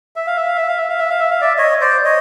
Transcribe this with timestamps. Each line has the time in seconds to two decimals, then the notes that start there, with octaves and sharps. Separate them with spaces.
0.16 E5
0.27 F5
0.37 E5
0.47 F5
0.57 E5
0.68 F5
0.78 E5
0.89 F5
0.99 E5
1.10 F5
1.19 E5
1.31 F5
1.41 D5 E5
1.57 C#5 D#5
1.81 C5 D5
2.05 C#5 D#5